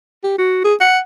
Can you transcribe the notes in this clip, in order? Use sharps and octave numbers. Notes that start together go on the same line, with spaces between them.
G4
F#4
G#4
F#5